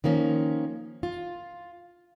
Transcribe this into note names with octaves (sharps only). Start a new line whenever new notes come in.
D#3 F3 A#3 C#4
F4